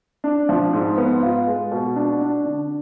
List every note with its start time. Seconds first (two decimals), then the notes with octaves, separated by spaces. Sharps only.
0.24 D4
0.49 F3
0.73 G#2
0.98 B3
1.23 F4
1.47 G#3
1.72 B2
1.96 D4
2.21 D4
2.45 D3